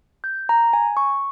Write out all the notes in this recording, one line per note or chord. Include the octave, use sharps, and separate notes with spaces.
G6
A#5
G#5
C#6